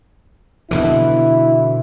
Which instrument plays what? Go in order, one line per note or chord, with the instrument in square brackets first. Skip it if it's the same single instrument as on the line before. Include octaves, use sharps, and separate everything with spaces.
[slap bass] B2 D3 E3 [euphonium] E4